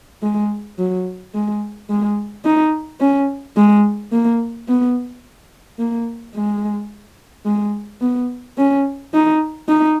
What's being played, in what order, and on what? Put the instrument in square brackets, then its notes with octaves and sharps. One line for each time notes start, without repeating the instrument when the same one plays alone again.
[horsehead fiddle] G#3
F#3
G#3
G#3
D#4
C#4
G#3
A#3
B3
A#3
G#3
G#3
B3
C#4
D#4
D#4